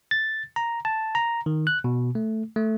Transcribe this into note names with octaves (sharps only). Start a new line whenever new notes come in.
A6
A#5
A5
A#5
D#3
F#6
B2
A3
A3